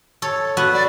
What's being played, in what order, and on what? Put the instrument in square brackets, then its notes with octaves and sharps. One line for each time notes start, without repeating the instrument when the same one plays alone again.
[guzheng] A4 C#5
B3 F#4
[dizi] D5